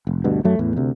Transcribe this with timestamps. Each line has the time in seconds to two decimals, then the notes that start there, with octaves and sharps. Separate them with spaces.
0.07 F1
0.24 D2 G2 B2
0.44 F#2 F#3 A3
0.59 E2 A2 E3
0.77 D2 C3